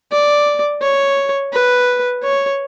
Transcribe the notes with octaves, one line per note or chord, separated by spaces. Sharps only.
D5
C#5
B4
C#5